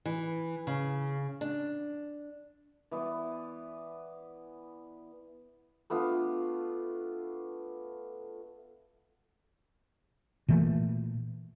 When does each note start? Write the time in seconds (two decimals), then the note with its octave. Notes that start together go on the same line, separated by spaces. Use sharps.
0.05 E3
0.67 C#3
1.41 D4
2.91 E3 B3 D5
5.90 A3 B3 D4 F4
10.48 A#2 E3 A3